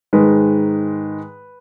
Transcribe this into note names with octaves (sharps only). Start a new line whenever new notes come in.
G#2 D#3 G#3 B4